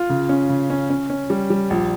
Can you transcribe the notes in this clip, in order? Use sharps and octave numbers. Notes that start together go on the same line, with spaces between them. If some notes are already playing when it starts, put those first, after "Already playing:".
Already playing: F4
C#3
C#4
C#3
C#4
C#4
C#4
G3
G3
A#1